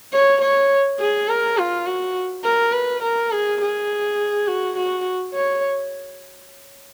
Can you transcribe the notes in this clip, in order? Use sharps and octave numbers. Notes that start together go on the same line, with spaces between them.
C#5
C#5
G#4
A#4
F4
F#4
A#4
B4
A#4
G#4
G#4
F#4
F#4
C#5